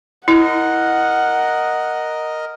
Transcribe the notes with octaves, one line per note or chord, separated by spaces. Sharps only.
E4 A#4 D#5 F#5